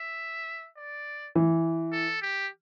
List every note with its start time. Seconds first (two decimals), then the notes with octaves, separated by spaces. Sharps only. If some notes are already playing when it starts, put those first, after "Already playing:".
Already playing: E5
0.77 D5
1.35 E3
1.92 A4
2.22 G4